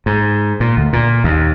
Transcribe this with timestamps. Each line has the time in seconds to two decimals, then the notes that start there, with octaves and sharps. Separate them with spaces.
0.06 G#2
0.60 A#2
0.77 D2
0.93 A#2
1.24 D#2